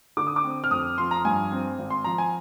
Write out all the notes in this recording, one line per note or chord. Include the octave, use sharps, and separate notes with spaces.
D3 D6
D#6
D6
C4
F6
F2 D#6
F3 C6
A#5
G2 G#5
C4
G#1
C6
F3 A#5
G#5